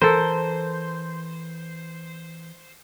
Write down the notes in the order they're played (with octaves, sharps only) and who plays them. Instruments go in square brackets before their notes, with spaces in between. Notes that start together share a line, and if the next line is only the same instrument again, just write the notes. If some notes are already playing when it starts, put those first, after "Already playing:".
[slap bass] E3 [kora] A4 A#4 [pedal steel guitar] C5